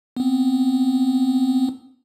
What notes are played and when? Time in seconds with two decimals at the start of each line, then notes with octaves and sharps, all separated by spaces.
0.17 B3 C4